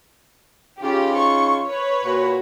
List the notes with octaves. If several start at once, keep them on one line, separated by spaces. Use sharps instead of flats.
C#3 D#4 F4 G4
C#6
B4 C#5
A#2 F4 F#4